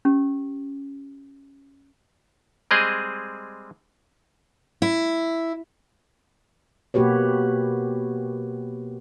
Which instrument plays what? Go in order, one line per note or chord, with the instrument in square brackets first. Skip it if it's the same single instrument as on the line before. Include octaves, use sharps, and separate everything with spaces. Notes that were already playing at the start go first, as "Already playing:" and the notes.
[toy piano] C#4 G4
[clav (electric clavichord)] G3 G#3 C4 G#4 D#5
[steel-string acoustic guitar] E4
[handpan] B2 A#3 F#4 G4 B4 C#5